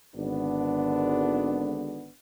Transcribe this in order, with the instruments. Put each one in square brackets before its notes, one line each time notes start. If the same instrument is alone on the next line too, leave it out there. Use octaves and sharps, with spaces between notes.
[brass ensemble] G#1 D3 B3 D4